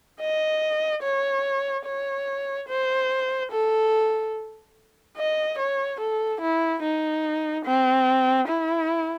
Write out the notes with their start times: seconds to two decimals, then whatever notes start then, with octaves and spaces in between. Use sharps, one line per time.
0.20 D#5
1.03 C#5
1.86 C#5
2.68 C5
3.52 A4
5.17 D#5
5.58 C#5
6.00 A4
6.41 E4
6.83 D#4
7.65 C4
8.48 E4